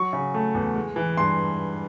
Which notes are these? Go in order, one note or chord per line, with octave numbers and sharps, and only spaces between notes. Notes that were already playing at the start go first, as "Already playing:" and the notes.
Already playing: F#3 C#6
C#3
A3
E2
G#3
E3
G2 C6